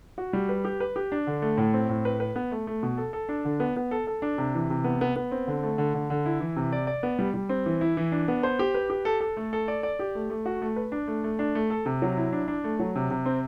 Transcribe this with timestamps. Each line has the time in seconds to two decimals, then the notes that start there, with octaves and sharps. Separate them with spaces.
0.18 F#4
0.33 G3
0.49 B4
0.65 G4
0.80 B4
0.96 G4
1.12 D4
1.27 D3
1.42 A3
1.57 A2
1.74 C4
1.89 A2
2.05 B4
2.20 B4
2.36 B3
2.52 A3
2.67 A3
2.83 B2
2.98 A4
3.13 A4
3.29 D4
3.45 D3
3.60 B3
3.76 B3
3.91 A4
4.07 A4
4.22 D4
4.38 C3
4.54 E3
4.70 C3
4.84 B3
5.01 B3
5.16 B3
5.32 C4
5.47 D3
5.63 A3
5.78 D3
5.94 D3
6.10 D3
6.26 E4
6.41 E3
6.56 C3
6.73 D5
6.87 D5
7.03 B3
7.19 G3
7.34 G3
7.49 C4
7.66 E3
7.81 E4
7.97 E3
8.12 D4
8.28 B3
8.43 C5
8.59 G4
8.75 B4
8.90 G4
9.05 A4
9.20 A4
9.37 A3
9.53 A4
9.68 D5
9.83 D5
9.99 G4
10.15 A3
10.30 A3
10.46 F#4
10.62 A3
10.76 B4
10.92 D4
11.08 A3
11.24 A3
11.39 D4
11.55 A3
11.70 A4
11.86 C3
12.02 F#3
12.17 E4
12.33 D4
12.48 D4
12.64 A3
12.79 F#3
12.95 C3
13.10 C3
13.26 C4